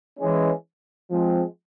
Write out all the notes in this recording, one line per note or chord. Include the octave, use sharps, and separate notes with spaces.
E3 G#3 C#4
F3 G#3 C4